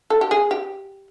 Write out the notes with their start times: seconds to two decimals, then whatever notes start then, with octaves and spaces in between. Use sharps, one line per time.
0.10 A4
0.21 G4
0.31 G#4
0.51 G4